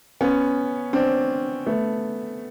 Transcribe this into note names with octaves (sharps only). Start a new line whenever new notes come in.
B3 C#4
C4 D4
A3 B3